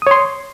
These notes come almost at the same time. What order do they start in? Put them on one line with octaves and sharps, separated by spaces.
D#6 C#5 C6